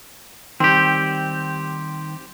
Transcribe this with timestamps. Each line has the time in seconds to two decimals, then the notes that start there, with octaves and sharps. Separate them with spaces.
0.60 D#3 G3 C4 G4